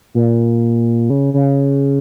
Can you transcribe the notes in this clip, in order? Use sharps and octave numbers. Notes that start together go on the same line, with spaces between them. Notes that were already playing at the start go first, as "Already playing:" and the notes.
A#2
C#3
C#3